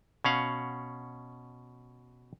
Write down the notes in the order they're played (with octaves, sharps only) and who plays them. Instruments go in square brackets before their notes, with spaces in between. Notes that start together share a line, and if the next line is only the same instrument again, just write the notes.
[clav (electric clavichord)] B2 C#4 F5 F#5